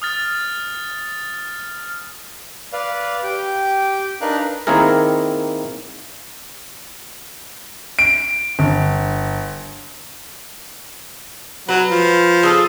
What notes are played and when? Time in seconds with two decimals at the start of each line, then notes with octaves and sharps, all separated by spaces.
0.02 D#6 F6 A6
2.73 B4 D5 F5
3.23 G4 G5
4.21 D4 D#4 A#4 B4 F5 F#6
4.67 D#3 A#3 C4 E4 G#4 A#4
7.99 D7
8.59 G1
11.69 F#3 B4
11.90 F3
12.43 G#4 A4